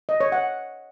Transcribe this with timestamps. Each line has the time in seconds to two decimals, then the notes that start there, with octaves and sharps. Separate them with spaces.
0.09 D#5
0.20 C#5
0.32 F#5